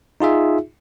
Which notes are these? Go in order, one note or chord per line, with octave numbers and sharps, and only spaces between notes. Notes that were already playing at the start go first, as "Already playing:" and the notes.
D#4 F4 G#4 E5